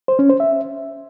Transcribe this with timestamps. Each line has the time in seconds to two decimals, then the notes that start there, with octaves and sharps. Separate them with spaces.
0.08 C5
0.19 C#4
0.29 C5
0.40 E5